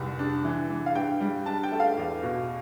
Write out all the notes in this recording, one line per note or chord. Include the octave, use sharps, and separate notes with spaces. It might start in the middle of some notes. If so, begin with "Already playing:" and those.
Already playing: F1 C2
D4
E3
E3
F5
G2 G5
G3
D4 A5
G5
A3
F5
E2
B2